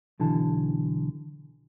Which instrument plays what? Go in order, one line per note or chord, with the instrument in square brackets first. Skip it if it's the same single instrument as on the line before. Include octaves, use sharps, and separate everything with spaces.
[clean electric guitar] B1 D3 E3 A5